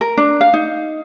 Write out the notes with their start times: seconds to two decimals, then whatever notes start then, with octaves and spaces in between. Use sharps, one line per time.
0.01 A#4
0.17 D4
0.41 F5
0.54 D#4